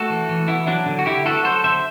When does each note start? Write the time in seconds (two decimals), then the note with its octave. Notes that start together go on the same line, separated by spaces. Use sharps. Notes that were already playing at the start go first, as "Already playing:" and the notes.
Already playing: A3 F#4 A4
0.10 E3
0.29 E3
0.48 B3 E4
0.67 F#3 D4
0.86 D3
0.99 F#4
1.06 D3 E4 G4
1.25 B3 F#4 A4
1.44 F#3 A4 C5
1.64 D3 C5 E5